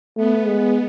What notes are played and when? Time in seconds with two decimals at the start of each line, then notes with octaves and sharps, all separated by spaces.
0.17 A3 B3
0.47 G#3 B3